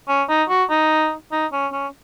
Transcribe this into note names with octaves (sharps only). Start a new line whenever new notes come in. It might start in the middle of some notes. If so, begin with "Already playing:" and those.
C#4
D#4
F#4
D#4
D#4
C#4
C#4